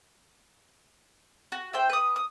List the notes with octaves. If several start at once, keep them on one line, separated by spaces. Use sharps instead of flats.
F#4
E4 C5 G5
B4 D#6
D#6